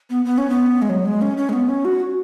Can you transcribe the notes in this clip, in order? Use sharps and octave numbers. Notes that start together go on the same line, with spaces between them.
B3
B3
C#4
B3
G#3
F#3
G#3
C#4
C#4
G#3
B3
C#4
F#4